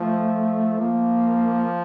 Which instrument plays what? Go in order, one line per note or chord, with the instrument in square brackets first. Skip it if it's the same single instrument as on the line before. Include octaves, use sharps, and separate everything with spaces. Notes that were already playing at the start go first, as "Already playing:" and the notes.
Already playing: [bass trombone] F3 [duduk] A3
[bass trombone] F3 [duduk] A#3